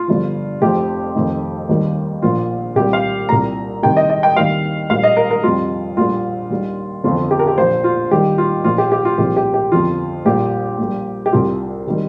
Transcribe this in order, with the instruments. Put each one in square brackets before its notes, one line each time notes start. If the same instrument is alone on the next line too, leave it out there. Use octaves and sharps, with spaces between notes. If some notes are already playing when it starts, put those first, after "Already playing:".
Already playing: [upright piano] F4
G1 G2 F3
F1 F2 F3 G4
F1 F2 D#3
D#2 D#3 G3
A#1 A#2 F3 F4
C2 A#2 G3 G4
F5
C2 A#2 G3 A#5
C2 C3 D#3 G3 G5
D#5
D#5
G5
D#2 D#3 G3 F5
A#1 A#2 G3 F5
D#5
A#4
A#4
F2 C3 G3 F4
A#1 A#2 G3 F4
D#2 D#3 G3
G1 F2 F3 F4
G4
A#4
G4
A#1 A#2 F3 C5
F4
D#2 D#3 G3 G4
F4
A#1 A#2 F3 F4
G4
G4
F4
C2 A#2 F3 G4
G4
G4
G1 F2 F3 F4
A#1 A#2 G3 G4
A#1 A#2 G3
G4
C2 C3 G3 F4
C3 D#3 G3